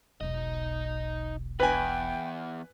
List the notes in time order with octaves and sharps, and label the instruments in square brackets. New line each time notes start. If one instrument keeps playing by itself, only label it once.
[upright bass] E1 B1 [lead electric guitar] D#4 D#5
[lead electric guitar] E2 [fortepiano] B4 G#5 [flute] G5